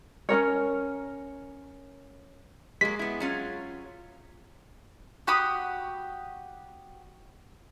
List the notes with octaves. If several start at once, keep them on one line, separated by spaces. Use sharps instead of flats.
C#4 D#4 A#4 C#5
F#3 G#3 A#3 B6
B3 E4
F#3 C#4 F4
F#4 G4 B5 D#6